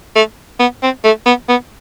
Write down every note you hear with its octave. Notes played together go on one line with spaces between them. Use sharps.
A3
B3
C4
A3
B3
B3